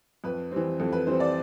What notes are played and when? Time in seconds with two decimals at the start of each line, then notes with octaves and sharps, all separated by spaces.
0.24 F2 B4
0.51 E3 G3 C4
0.80 F2 A4
0.93 B4
1.07 E3 G3 C4 C5
1.20 D5